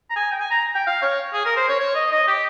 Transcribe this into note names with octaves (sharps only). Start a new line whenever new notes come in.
A#5
G#5
G5
G#5
A#5
G5
F5
C#5
G#4
A#4
C5
C#5
C#5
D#5
D#5
G4